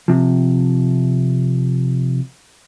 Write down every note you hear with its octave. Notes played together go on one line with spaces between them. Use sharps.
C3 F3